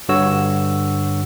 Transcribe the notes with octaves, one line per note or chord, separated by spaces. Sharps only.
G2 D3 F#4 C#5 E6